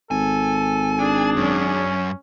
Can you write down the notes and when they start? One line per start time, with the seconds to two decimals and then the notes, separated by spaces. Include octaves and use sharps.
0.11 G#1 A4 G#5
0.99 D4 G#4
1.36 F#2 C#4